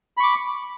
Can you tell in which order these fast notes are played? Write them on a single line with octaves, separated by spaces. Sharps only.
B5 C#6 D6